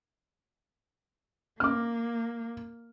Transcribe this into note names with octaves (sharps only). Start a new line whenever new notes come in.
A#3 D6 F6